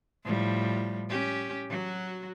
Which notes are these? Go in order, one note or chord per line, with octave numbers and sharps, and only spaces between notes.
A2 F3 G3
C#4 G4
F#3 F#4